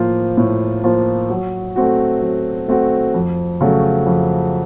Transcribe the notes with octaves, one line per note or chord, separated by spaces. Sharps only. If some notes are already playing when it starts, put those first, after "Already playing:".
Already playing: A2 F3 A#3 F4 C5
A2
F3 A#3 F4 C5
F#3
A3 C4 F#4
F#3
A3 C4 F#4
F2
C#3 F#3 A3
F2